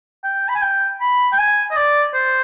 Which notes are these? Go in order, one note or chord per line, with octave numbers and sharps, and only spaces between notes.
G5
B5
G#5
G5
B5
G5
G#5
D#5
D5
C5